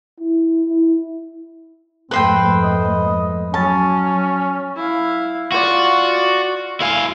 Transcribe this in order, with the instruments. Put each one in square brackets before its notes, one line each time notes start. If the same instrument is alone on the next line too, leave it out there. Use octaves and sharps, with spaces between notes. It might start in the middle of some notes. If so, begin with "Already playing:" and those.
[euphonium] E4
E4
[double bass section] F2 G#2 A3 [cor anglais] C4 [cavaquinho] B4 C5 G5
[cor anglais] D#5
[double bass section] F#3 [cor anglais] C#4 [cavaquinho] A5
[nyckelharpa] E4 F5
[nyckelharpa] F4 D5 [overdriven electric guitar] F#4
[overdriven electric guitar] E4 F5 [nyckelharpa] G#5